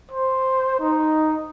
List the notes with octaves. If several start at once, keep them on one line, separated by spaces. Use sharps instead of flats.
C5
D#4